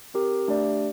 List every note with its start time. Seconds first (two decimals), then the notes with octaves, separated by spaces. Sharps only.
0.14 C4 G4 A#4
0.48 A3 D4 G4 D5